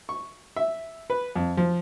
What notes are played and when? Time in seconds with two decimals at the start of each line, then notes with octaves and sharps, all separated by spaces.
0.09 C#6
0.56 E5
1.10 B4
1.36 F2
1.57 F3